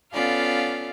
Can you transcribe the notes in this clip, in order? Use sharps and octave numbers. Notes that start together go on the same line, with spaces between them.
B3 C#4 F4 A4 D5 F5